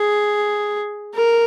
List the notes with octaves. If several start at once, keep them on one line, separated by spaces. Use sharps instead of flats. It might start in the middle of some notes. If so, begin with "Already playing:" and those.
Already playing: G#4
A#4